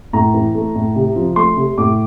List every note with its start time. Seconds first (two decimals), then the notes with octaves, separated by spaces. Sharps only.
0.13 A2 A#5
0.34 E3
0.55 A3
0.75 A2
0.95 C3
1.16 F3
1.36 A3 C6
1.57 C3
1.78 A2 D6